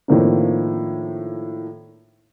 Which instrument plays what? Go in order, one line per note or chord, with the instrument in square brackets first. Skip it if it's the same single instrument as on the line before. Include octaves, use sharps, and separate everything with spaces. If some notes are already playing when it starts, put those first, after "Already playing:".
[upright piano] A2 D#3 F3 A#3 C4 D4